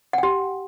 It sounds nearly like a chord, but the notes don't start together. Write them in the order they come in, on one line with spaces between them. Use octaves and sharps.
F#5 G5 G4